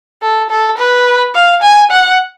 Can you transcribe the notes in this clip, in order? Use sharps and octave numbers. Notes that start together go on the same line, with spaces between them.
A4
A4
B4
F5
G#5
F#5